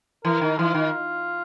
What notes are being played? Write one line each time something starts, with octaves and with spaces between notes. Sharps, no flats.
E3 A#4
D#3
E3 F4
D#3